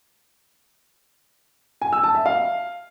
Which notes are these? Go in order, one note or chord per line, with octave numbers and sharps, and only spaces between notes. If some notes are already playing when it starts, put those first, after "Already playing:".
G#5
E6
A5
E5
F5